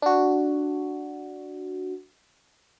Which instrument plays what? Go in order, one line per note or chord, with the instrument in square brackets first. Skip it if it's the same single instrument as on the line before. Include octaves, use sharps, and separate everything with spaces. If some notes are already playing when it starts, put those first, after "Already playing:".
[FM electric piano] D4 F#4